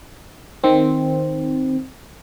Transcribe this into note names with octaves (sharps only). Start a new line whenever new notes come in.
D#3 C4